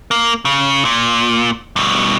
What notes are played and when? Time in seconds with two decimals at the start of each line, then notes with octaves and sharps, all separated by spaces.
0.11 A#3
0.45 C#3
0.85 A#2
1.76 G2 B2